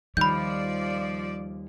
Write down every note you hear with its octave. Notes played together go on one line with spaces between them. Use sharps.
D#2 F3 G3 D5 B5 F6 G6 D#7